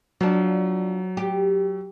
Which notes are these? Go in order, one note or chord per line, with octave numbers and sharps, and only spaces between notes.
F3 F#3 D4
G4